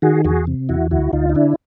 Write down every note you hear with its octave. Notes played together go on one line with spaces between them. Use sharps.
D#3 F#4 G#4
E2 F#4 G#4
C3
E2 E4 F#4
D2 E4 F#4
D2 D#4 F4
D#4
D3 D4 E4